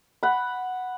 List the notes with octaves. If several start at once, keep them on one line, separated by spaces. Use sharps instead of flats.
F#5 B5